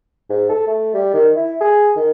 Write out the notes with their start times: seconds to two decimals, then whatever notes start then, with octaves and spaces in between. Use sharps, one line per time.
0.30 G#2
0.49 A4
0.67 A3
0.94 G3
1.14 D#3
1.35 E4
1.61 G#4
1.96 D#3